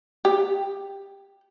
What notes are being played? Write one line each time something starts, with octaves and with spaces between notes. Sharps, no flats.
G4